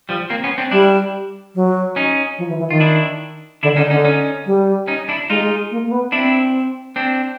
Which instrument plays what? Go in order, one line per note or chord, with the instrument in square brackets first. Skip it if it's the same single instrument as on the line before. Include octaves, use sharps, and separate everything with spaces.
[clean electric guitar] F3 G3
A#3 C4
B3 C#4
C4 D4
[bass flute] G3 [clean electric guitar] D4 E4
[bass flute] F#3
[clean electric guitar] C#4 D#4
[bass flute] F3
E3
E3
[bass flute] D#3 [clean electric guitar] F4
[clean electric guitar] D4 E4
[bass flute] D3 [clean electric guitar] D4 E4
[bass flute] D3 [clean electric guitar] C#4 D#4
[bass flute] D3 [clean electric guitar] C#4 D#4
[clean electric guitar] C#4 D#4
[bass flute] G3
[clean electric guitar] C#4 D#4
D4 E4
[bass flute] G#3 [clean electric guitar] D#4 F4
[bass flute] G#3
A#3
A#3
B3
[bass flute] C4 [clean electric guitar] D4 E4
[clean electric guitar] C4 D4